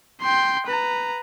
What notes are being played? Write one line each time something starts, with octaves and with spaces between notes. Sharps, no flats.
G5 C6
B4 A#5